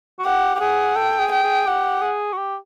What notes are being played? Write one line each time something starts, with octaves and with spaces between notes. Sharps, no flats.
F#4
G4 F#5
G4
G#4 F#5
A4 G5
G#4
G5
G#4
G4 F#5
G#4
F#4
G4